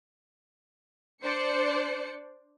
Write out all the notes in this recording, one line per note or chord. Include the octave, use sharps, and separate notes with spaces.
D4 C5 D5 C#7